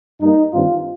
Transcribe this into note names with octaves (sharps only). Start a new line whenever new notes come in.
G2 G3 A#3 D#4
G2 D#3 G3 C4 F4